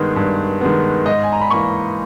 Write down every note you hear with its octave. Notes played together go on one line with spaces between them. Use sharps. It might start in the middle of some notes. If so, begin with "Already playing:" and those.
Already playing: G2 D#3 G#3 B3
G2
D#3 G#3 B3
G#2 D#5
G#5
A#5
B5
E3 A#3 C#6